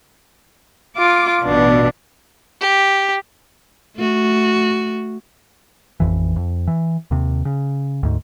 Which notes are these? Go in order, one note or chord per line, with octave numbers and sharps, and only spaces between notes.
F4 D6
A1 B2 D4
G4
A3 F#4
A1 F2 E3
F2
E3
D#2 C3
C#3
D2 G#2